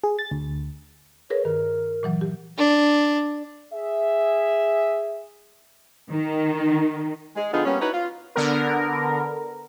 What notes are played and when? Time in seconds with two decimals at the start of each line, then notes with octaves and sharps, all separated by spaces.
0.04 G#4
0.19 A6
0.31 D2
1.30 G#4 A#4 B4 C#5
1.45 G2 D#3 A#4
2.03 A#2 E3 F#3
2.21 G4
2.57 D4
3.73 G#4 E5
6.10 D#3
7.36 G#3
7.53 D3 F3 B3 D#4 F4 G#4
7.65 G3 A#3 B3 C#4
7.81 D#4 E4 F#4 B4 C#5
7.93 F4
8.36 D3 B3 A#4